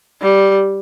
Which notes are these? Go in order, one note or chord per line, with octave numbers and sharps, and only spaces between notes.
G3